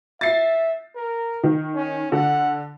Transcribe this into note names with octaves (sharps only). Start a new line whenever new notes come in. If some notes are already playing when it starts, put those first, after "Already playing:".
E5 A6 C7
A#4
D#3
C#4
D3 F#5